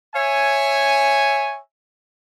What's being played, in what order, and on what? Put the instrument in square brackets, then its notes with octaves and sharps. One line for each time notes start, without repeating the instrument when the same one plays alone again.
[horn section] C#5 E5 G#5